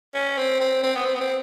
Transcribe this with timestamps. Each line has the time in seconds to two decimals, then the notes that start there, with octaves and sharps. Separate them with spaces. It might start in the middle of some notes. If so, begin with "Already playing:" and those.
0.14 C#4
0.38 C4
0.60 C4
0.83 C4
0.96 B3
1.06 C4
1.15 B3
1.20 C4